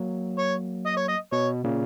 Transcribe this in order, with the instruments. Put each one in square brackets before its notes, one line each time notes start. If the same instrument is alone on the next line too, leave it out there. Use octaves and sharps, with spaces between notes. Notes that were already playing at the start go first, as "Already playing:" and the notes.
Already playing: [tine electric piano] F#3 A#3
[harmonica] C#5
D#5
C#5
D#5
[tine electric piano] B2 [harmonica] C#5
[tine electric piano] A#2 C#3